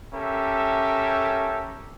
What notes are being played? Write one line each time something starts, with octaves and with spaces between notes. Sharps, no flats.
C#4 G4 A4 A#4 E5